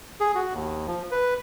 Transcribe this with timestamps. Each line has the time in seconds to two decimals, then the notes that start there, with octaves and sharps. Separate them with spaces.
0.20 G#4
0.35 F#4
0.53 D#2
0.87 F3
1.11 B4